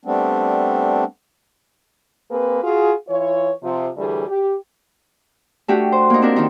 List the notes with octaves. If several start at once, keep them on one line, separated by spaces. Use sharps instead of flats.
G3 A3 B3 C4 D4
A#3 C4 G#4 B4
F4 F#4 G#4
E3 F4 C#5
C3 F3
D2 A2 E3 G3 G#4
G4
A3 D4 F#4 G4
C5
A#3 D#4
C4 D4 A#4
D#3 A#3 D#4